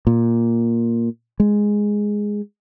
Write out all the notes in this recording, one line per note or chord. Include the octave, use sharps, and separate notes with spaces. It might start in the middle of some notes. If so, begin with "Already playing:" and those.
A#2
G#3